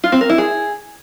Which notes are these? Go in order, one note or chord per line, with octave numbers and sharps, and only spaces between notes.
F4
C4
A#4
E4
G#4